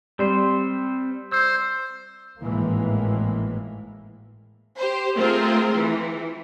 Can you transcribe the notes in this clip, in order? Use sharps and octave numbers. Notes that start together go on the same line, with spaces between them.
G3 C4 C5
C5 E6
G#1 A2 E3 G#3 A#3
G4 C5
A3 C4 F4 G#4 A#4 C5
E3